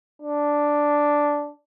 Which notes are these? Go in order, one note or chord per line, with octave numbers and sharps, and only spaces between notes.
D4